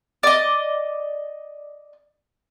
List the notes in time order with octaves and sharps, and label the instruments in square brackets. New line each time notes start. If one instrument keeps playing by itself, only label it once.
[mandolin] D5 D#5